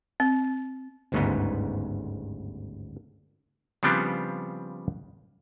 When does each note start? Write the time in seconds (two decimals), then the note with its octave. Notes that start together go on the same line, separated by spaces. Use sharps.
0.20 C4
1.12 G1 D2 G#2 C#3 B3 D#4
3.83 C#3 F3 G3 B3 C4 D4